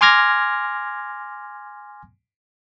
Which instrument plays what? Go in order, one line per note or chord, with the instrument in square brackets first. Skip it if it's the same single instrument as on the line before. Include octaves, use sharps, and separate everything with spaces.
[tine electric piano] G#5 C6 D6 F6 G#6 A#6